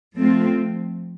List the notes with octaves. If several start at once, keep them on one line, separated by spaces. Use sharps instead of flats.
F3 A3 C4 F4